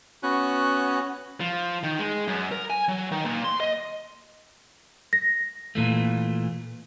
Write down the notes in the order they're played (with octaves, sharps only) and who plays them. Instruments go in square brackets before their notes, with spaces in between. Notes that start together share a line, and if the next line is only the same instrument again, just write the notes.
[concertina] B3 F#4 F#6 [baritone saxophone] C#4
[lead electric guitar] F3
D#3
G#3
F#2
A#4
G#5
F#3
D#3
A#2
C6
D#5
[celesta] A#6
[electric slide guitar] A#2 E3 A3